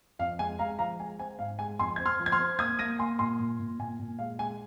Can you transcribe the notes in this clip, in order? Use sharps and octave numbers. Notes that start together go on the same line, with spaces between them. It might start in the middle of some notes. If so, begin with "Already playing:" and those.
F2 F5
G#3 G#5
G#3 F5 A#5
F3 F5 A#5
G#3 G#5
C4 G#5
G#2 F5
G#3 G#5
F2 G#5 C6
C4 G#6
C6 F6
F3
G#6
C6 F6
C4
A#3 D#6 G#6
A#3 A#6 D#7
A#3 G#5 C6
A#2 G#5 C6
A#2
A#2
A#2 G#5
A#2
G#3 F5
G#3 G#5